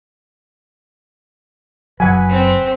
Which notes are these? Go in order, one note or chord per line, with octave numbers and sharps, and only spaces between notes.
F#1 F#3 B4 F#5 G#5
C4